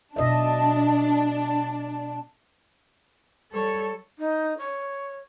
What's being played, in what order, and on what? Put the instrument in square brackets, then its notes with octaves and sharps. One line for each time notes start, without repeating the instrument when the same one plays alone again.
[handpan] B2 D#5 E5 [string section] D4
[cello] G3 C#5 [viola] A4
[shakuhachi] D#4
C#5